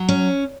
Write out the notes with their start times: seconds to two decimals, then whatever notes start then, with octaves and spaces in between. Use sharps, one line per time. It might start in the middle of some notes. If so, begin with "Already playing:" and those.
Already playing: F#3
0.09 C#4